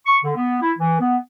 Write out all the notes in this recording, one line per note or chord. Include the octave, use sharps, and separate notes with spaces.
C#6
D3
B3
E4
E3
B3